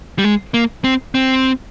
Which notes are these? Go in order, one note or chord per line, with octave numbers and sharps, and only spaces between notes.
G3
G#3
A#3
C4
C4